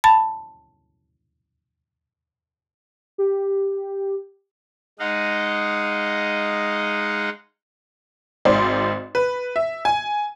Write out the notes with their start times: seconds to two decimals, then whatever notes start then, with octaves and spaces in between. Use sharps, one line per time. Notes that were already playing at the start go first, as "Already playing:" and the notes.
0.04 A5 B5 A6
3.18 G4
4.99 G#3 D#4 D#5 F5 F#5
8.45 G#1 G#2 C5 D5 C6
9.15 B4
9.56 E5
9.85 G#5